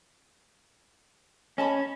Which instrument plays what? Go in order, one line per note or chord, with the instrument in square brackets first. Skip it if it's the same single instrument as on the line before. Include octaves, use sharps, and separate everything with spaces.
[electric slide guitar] C#4 [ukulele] D#5 A5 B5